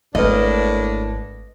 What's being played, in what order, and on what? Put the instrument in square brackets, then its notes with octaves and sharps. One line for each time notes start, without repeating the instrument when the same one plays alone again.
[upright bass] G#1 [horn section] A2 A#3 D4 [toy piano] B4 E5 [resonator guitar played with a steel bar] D#5